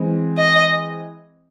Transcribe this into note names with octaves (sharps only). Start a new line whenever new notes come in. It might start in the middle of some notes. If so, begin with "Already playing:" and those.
Already playing: E3 G#3 C4
D#5